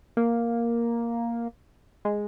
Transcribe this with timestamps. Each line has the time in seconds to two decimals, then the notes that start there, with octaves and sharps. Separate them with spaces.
0.17 A#3
2.05 G#3